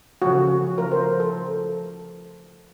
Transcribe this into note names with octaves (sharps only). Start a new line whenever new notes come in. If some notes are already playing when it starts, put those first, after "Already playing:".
C#3 F3 A3 F#4
C#3 F3 A3 A#4
C5
A4
C#3 F3 A3